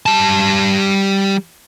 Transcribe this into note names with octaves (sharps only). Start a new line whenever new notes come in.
G3 A5